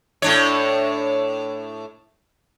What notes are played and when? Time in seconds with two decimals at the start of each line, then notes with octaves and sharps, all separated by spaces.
0.22 A2 D4 C#5